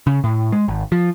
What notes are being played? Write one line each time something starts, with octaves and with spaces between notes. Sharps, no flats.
C#3
A2
G#3
G#1
F3